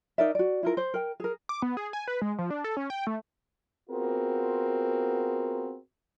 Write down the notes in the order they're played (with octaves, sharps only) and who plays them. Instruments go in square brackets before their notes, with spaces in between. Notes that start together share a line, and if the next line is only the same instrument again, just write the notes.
[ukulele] D#4 A#4 D5 E5
F#4 D5
E4 F4 A#4
C5
A#4 G5
G#4 A#4
[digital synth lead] D6
B3
G#4
G#5
B4
G#3
F3
D4
A4
C#4
G5
A3
[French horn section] B3 C4 F4 F#4 G#4 A#4